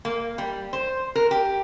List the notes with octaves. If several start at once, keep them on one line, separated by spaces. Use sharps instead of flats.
A#3
G3
C5
A#4
G4